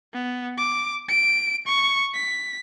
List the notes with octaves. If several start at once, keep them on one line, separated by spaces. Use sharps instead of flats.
B3
D6
D7
C#6
B6